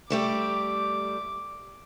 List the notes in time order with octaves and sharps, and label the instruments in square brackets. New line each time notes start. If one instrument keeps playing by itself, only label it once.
[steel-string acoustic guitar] G3 A3 G4 [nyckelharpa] D6